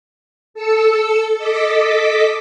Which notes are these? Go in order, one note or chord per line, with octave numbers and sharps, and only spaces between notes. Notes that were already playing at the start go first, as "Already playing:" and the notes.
A4 E6 C#7
A4 D#5 D6 B6